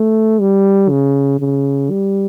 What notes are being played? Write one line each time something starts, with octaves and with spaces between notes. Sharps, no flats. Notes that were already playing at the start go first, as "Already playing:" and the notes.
Already playing: A3
G3
C#3
C#3
G3